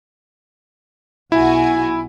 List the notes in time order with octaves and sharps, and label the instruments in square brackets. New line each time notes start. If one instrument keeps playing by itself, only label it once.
[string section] B1 F#4 G#5 [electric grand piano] E4